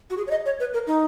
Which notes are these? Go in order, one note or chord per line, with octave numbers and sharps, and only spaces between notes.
F#4
G#4
C#5
D#5
C#5
B4
A#4
D#4